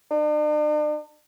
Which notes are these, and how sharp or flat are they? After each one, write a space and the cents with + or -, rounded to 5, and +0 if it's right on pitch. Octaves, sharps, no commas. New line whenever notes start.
D4 +45